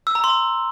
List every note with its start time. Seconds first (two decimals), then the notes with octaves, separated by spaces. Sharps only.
0.07 E6
0.15 A#5
0.24 C6